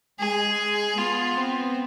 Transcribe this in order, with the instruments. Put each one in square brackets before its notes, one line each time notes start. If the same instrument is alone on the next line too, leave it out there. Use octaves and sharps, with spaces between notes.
[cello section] G#3 [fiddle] G#4
[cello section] B3 [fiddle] F4
[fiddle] C4